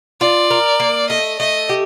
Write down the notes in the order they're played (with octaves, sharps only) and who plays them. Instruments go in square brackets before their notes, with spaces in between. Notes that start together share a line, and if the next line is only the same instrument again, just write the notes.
[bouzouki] F4 [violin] D5
[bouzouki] A#4
A#3
[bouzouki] A3 [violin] D#5
[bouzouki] A3 [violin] D#5
[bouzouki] G4